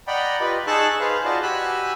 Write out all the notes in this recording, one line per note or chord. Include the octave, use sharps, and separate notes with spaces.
D5 D#5 F#5 G5 A#5 B5
F4 G4 B4 D5 D#5
D#4 G#4 A5 C#6 E6 F#6
G#4 B4 C5 F5
F4 F#4 C5 D5 D#5 A5
F#4 G4 G#5 B5 E6 F#6